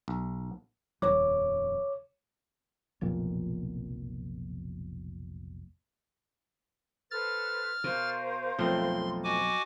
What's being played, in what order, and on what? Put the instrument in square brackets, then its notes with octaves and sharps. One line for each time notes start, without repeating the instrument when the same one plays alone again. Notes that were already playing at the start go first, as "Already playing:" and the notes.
[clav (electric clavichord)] B1
[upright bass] D#1 F2 [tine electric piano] C#5 D6
[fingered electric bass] F1 B1 F2 A#2
[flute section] A4 B4 C5 [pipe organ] F6 A6
[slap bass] B2 [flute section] A#4 C5 F5
[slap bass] B1 F2 [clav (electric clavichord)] F3 A3 C4 [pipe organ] C6
[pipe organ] F#4 G#5 D6 [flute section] D#5